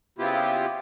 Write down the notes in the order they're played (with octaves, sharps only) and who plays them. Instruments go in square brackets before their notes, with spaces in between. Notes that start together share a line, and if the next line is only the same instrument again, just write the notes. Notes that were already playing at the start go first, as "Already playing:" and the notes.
[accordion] C#3 B3 C4 E4 F4 G4